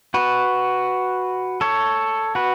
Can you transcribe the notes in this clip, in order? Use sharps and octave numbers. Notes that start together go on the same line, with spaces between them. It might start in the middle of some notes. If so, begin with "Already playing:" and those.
F#4 B4
A4 C#5
F#4 B4